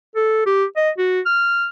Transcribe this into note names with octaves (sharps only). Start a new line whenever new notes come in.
A4
G4
D#5
F#4
F6